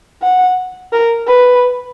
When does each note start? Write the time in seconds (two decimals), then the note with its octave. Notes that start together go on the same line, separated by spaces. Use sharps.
0.22 F#5
0.92 A#4
1.27 B4